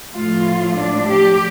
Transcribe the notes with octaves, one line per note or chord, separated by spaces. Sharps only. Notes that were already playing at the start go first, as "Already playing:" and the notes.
A2 F3 A3 F4
D4
G4